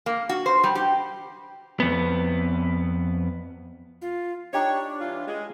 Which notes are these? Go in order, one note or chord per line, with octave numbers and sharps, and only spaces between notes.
A#3
F#4
C5
G3
G4
F2 B3
F4
D4 D#4 G4 C#5
E3 G3 F4
G#3